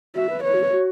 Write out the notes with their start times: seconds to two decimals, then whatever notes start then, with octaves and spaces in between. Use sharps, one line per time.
0.15 F#4 E5
0.29 B4
0.44 B4 C#5
0.54 F#4
0.63 B4
0.72 F#4